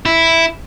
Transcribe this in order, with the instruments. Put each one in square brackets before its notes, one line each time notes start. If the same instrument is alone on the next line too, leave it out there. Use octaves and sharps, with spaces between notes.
[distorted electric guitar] E4